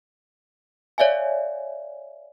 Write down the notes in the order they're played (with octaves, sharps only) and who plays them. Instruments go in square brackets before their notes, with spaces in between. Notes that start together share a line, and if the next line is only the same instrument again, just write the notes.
[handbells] C#5 D5 E5 F5 G#5